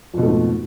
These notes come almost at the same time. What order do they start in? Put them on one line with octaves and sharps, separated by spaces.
F2 B2 A3 G#2